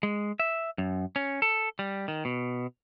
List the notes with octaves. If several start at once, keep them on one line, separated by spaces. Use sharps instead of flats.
G#3
E5
F#2
C#4
A4
G3
D#3
B2